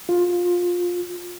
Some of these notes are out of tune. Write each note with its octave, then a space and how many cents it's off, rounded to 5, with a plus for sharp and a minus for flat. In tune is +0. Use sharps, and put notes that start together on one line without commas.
F4 +15